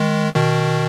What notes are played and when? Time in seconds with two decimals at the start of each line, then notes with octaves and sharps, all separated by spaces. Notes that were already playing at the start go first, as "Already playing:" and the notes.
Already playing: D#3 G#3
0.35 B2 D#3